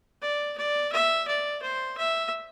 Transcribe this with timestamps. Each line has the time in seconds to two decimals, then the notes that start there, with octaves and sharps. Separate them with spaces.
0.22 D5
0.57 D5
0.92 E5
1.28 D5
1.62 C5
1.97 E5